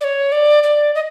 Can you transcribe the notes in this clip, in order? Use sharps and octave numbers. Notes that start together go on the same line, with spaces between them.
D5
C#5
D5
D5
D#5